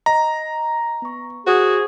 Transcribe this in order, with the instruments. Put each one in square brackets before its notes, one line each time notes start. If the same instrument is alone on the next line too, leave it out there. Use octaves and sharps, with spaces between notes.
[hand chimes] D#5 [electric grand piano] A#5
[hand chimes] B3 C#6
[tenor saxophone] F#4 [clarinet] G#4 [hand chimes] C5